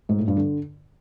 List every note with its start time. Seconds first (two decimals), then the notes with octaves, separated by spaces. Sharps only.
0.09 G#2
0.18 A2
0.28 G2
0.37 D3